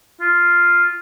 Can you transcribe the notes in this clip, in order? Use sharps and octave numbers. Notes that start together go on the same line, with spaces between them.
F4